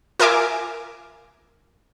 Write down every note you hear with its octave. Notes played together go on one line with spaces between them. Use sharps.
F4 A#4 E5 G#5 D6